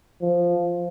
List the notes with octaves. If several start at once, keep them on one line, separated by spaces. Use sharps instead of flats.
F3